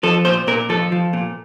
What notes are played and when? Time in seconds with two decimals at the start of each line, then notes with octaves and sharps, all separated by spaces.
0.03 F3 A4
0.25 A#2 C5
0.47 A#2 A#4
0.69 F3 A4
0.92 F3
1.13 A#2